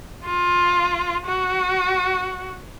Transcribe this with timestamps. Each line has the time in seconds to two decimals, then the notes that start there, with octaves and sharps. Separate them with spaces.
0.25 F4
1.26 F#4